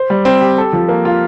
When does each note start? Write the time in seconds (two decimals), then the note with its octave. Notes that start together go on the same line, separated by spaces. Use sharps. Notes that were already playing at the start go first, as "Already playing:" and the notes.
Already playing: C5
0.10 G3
0.25 C4
0.41 G4
0.58 A4
0.73 F3
0.89 A#3
1.05 F4